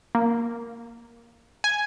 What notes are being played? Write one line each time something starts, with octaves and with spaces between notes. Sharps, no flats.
A#3
G#5